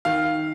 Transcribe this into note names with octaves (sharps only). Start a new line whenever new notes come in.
D#3 F5